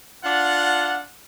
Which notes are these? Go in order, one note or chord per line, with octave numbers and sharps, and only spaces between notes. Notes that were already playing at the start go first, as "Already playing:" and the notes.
D4 F4 F#5